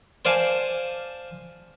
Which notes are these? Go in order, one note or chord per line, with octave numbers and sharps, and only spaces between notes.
C5 D5 F5 G#5 A5